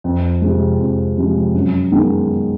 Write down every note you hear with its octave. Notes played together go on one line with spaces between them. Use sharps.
F2
C3 F3 G#3
F2
C3 F3 G#3
F#2
D#3 G#3 B3 D#4